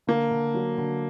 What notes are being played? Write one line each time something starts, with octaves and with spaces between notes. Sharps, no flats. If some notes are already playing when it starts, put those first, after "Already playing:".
D3 A#3
D3
F#3
D3